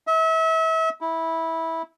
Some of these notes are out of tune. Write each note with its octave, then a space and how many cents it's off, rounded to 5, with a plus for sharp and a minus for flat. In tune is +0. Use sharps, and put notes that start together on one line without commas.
E5 -35
E4 -15